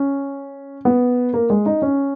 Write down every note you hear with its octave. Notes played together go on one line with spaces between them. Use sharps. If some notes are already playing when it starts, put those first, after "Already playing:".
Already playing: C#4
B3
A#3
G#3
D#4
C#4